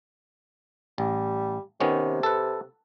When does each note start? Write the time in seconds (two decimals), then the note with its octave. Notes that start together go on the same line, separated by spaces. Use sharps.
0.98 A1 G3
1.80 C3 D#3 B3 C#4
2.23 A4 B4